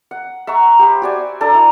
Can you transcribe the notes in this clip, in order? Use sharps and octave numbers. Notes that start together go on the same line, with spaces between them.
F#5
E5 F#5 A#5 C#6
G4 C5 B5
F#4 D5 G#5
D4 A4 D5 A#5
E4